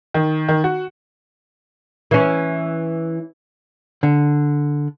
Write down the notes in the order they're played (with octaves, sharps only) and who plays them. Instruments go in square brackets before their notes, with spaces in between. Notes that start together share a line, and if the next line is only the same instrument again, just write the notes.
[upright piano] D#3
D#3
F#4
[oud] E3 C#4
[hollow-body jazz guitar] D3